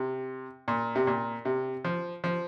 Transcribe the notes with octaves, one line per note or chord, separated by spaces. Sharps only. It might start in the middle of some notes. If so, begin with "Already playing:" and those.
Already playing: C3
A#2
C3
A#2
C3
F3
F3